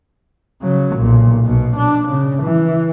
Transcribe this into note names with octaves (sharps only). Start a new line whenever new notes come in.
C#3 F#3
B1 A#2
B1 B2
D4
C#3
E3